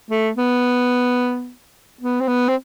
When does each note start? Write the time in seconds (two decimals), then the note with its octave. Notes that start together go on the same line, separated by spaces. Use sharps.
0.11 A3
0.37 B3
2.01 B3
2.21 C4
2.28 B3
2.48 C4